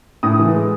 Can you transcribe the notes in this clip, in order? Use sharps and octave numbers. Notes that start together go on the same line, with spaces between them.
A2 D#6
E3
G#3